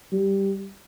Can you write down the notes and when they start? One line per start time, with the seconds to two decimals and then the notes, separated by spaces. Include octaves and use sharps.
0.12 G3